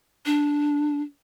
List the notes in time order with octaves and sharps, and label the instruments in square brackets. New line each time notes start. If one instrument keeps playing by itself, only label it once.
[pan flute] D4